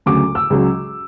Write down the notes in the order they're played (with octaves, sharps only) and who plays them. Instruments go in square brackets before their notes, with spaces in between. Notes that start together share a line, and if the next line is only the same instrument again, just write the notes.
[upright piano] D2 C#3 F#3 D6
E6
C#2 C#3 F#3